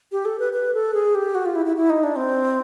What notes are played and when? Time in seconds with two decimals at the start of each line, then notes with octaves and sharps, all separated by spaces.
0.12 G4
0.25 A4
0.39 B4
0.53 B4
0.74 A4
0.94 G#4
1.15 G4
1.35 F#4
1.46 F4
1.55 E4
1.66 E4
1.76 E4
1.90 D#4
2.03 D4
2.16 C4